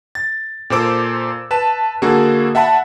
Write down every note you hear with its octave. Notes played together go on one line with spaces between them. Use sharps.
A6
A#2 A4 C5 D6 E6
B4 A5 E7
D3 A#3 F#4 G#4 A4
E5 F#5 A5 B5